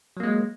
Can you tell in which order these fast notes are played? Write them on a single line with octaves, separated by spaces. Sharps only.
F#3 A#3 G#3